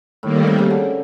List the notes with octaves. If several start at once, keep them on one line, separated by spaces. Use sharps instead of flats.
A2 D#3 G3 A#3
A#2
C3
C#3
D3